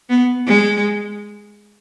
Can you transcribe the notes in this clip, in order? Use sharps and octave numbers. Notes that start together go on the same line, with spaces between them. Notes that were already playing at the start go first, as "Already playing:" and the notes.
B3
G#3